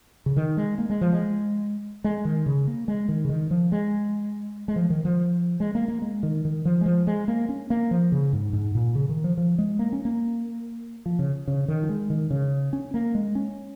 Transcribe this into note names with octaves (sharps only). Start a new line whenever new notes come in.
C#3
D#3
G#3
A#3
G#3
F3
G#3
G#3
D#3
C#3
A#3
G#3
D#3
C#3
D#3
F3
G#3
G#3
F3
D#3
F3
G#3
A#3
A#3
G#3
D#3
D#3
F3
G#3
F3
G#3
A#3
C#4
A#3
F3
C#3
G#2
G#2
A#2
C#3
D#3
F3
F3
G#3
A#3
C#4
A#3
F3
C#3
C#3
D#3
F3
G#3
D#3
C#3
C#4
A#3
G#3
C#4